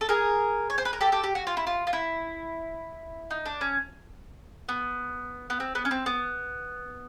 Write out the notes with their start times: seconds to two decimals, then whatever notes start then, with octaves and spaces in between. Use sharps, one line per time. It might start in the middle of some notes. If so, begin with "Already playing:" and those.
0.01 A4
0.09 G#4 A#4
0.70 C#5
0.78 C5
0.85 B4
0.93 A#4
1.01 G4 A4
1.12 G4 A4
1.24 G4
1.35 F#4
1.47 F4
1.57 E4
1.67 F4
1.87 F4
1.93 E4
3.31 D#4
3.46 D4
3.61 C#4
4.69 B3
5.50 B3
5.60 C4
5.75 B3
5.85 C#4
5.91 C4
6.06 B3